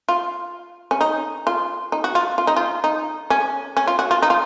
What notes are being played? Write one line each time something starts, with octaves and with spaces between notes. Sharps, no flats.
F4
C#4
D#4
F4
D#4
F#4
F4
F4
D#4
F4
D#4
C#4
C#4
F4
F#4
F4
D#4
F4